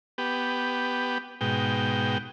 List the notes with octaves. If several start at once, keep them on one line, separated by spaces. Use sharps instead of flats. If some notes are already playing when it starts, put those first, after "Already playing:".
B3 G4
G#2 B2 G5